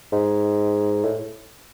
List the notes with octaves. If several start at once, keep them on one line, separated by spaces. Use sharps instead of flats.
G#2
A2